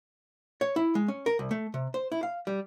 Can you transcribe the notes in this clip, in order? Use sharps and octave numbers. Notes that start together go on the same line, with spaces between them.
C#5
E4
G#3
C#4
A#4
C2
A3
C3
C5
E4
F5
G3